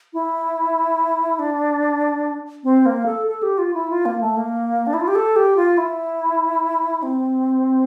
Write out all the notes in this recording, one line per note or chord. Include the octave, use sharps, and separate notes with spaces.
E4
D4
C4
A#3
A4
A4
G4
F4
E4
F4
A#3
A3
A#3
D4
E4
F4
G4
A4
G4
F4
E4
C4